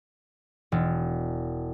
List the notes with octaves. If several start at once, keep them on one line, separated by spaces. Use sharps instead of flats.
E1